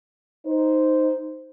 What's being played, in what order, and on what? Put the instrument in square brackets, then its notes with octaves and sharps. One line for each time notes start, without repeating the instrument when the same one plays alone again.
[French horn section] D#4 C5